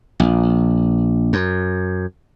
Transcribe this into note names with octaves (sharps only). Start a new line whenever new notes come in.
A#1
F#2